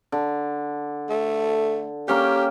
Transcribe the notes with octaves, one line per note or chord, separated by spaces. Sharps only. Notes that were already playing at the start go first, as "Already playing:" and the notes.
D3
A3
A#3 C#4 G4 G5